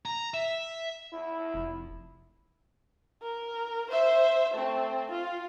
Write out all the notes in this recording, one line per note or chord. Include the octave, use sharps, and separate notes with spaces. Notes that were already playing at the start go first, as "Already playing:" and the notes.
A#5
E5
E4
F1
A#4
C5 E5
A3 C4
F4